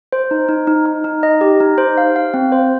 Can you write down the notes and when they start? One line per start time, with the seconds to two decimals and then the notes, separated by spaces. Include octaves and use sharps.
0.13 C5
0.31 D#4
0.48 D#4
0.67 D#4
0.86 D#4
1.04 D#4
1.23 D#5
1.41 G4
1.60 D#4
1.78 C5
1.98 F5
2.16 F5
2.34 C4
2.52 C5